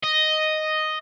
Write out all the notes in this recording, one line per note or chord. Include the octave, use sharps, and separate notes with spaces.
D#5